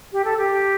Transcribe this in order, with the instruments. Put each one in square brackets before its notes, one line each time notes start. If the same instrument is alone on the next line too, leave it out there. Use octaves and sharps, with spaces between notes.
[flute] G4
A4
G4